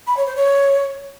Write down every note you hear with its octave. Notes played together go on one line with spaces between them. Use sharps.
B5
C#5
C5
C#5